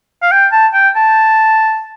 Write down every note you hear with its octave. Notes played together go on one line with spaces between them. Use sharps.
F5
G5
A5
G5
A5